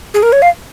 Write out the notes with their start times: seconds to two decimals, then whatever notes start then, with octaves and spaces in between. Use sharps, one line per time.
0.14 G#4
0.23 A#4
0.32 C#5
0.42 F5